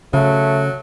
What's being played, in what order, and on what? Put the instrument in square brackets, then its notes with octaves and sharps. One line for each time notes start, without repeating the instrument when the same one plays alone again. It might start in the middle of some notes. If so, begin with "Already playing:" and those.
[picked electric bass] C#3 [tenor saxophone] F#3 [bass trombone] A3